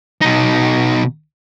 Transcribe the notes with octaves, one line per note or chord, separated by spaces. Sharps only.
B2 D#4